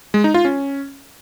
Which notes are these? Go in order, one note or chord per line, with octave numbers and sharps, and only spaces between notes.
G#3
D#4
F4
C#4